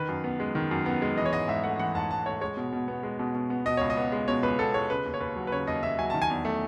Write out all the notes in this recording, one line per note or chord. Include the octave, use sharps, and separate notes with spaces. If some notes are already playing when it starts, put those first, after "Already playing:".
Already playing: D#3 B4
F#2
B3
G#3
D#3
F#2
B3
G#3
E3 D#5
C#5
G#2 D#5
G#2 E5
A3 F#5
E3 F#5
G#2 A5
G#2 A5
A3 C#5
G#3 C#5
B2
B2
B3
G#3
B2
B2
B3
B2 D#5
C#2 C#5
D#5
B3
G#3
B2 C#5
C#2 B4
B3 A4
G#3 C#5
C#3 B4
D#2
C#5
D#2 B4
F#3
B4
C#3 C#5
D#2 D#5
D#2 E5
F#3 G#5
D#3 A5
G#5
E2
A3